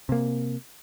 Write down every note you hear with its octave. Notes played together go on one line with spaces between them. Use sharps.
C3 A#3